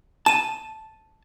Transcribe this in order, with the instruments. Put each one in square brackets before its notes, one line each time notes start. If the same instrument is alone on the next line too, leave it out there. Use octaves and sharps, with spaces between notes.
[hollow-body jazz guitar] A5 [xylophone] D#7 E7